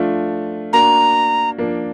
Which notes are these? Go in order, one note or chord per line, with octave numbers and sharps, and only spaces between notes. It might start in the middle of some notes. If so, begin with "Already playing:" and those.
Already playing: F3 A3 D4 F4
A#3 D4 F#4 A#5
F3 A#3 D4